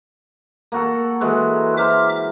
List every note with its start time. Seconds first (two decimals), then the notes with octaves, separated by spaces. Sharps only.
0.72 A#3 F#4 A4
1.21 E3 G#3 F#4 A4 B4
1.77 C5 E5 A#5 D6 F6